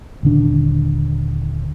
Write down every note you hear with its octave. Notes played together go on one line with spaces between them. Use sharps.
D#1 D3 D4